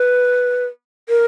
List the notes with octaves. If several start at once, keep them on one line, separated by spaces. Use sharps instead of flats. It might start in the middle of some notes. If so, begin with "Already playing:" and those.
Already playing: B4
A#4